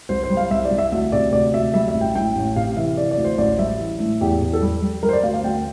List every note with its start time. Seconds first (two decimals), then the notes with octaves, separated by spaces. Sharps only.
0.09 C2 C5
0.24 C5
0.30 G3
0.37 F5
0.51 C2 E5
0.65 D5
0.71 C2
0.78 E5
0.92 D2 E5
1.12 C3 D5
1.33 D2 D5
1.54 D2 E5
1.74 G3 E5
1.88 E5
1.94 A1
2.01 G5
2.15 A2 G5
2.36 A1
2.56 C3 F5
2.77 E3 E5
2.97 E3 D5
3.11 D5
3.18 D2
3.24 C5
3.38 A1 D5
3.59 G3 E5
3.79 E3
4.00 A2
4.21 E2 G4
4.41 E2
4.53 A4
4.62 G3 G4
4.82 G3
5.03 G3 A#4
5.09 C5
5.13 D5
5.23 D2 F5
5.34 F5
5.44 D2 G5